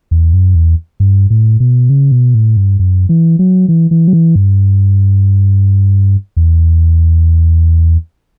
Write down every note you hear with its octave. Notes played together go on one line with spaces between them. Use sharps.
E2
F#2
E2
G2
A2
B2
C#3
B2
A2
G2
F#2
E3
F#3
E3
E3
F#3
E3
G2
E2